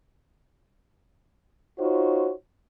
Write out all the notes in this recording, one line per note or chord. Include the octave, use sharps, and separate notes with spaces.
D#4 F4 F#4 C5 C#5